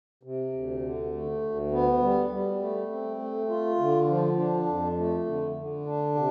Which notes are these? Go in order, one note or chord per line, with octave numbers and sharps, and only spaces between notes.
C3
D2
D3
A3
D2
B3
G3
G3
A3
C4
A3
F4
D3
F3
D4
F2
A3
D3
D3
D4
C3